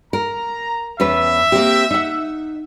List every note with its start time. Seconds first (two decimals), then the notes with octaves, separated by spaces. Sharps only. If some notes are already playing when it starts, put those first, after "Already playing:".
0.13 A#4 A#5
1.00 E2 C#4 B4 E5
1.52 A#3 C4 G4
1.91 D#4 F#5